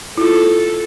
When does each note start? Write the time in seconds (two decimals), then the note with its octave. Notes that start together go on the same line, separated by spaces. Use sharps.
0.17 E4 F4 A4